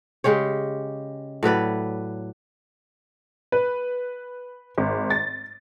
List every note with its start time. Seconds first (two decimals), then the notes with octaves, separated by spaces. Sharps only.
0.24 C#3 G#3 G4 C#5
1.43 A2 F#3 B4 D5
3.52 B4
4.78 G#1
5.10 A6